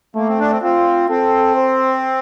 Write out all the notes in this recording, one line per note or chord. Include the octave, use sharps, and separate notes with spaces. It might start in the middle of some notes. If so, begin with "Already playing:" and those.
A3 A#3
C4
D4
C4
C4 F4
C4 A4
C5